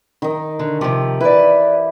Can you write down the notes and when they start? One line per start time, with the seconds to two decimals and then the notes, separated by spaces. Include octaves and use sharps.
0.22 D#3 D#4
0.59 D3
0.81 C3 F3 G4
1.20 E3 E4 B4 D5